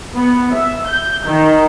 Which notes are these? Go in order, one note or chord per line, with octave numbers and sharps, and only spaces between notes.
B3
E5
G6
D#3